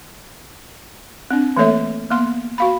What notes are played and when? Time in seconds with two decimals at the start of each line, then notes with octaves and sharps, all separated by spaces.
1.31 C4 D4
1.57 E3 A3 A#3 A4 C#5 E5
2.11 A#3 B3 C6
2.58 F#4 F5 B5